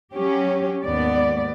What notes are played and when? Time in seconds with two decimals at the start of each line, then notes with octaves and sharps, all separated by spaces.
0.14 F#3 C#4 G4
0.84 D#2 G#2 B3 D5